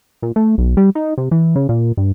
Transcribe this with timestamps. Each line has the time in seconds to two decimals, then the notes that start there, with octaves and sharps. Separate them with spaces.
0.22 A#2
0.36 A3
0.58 B1
0.77 G3
0.95 D#4
1.18 C3
1.31 E3
1.56 C#3
1.69 A#2
1.97 G2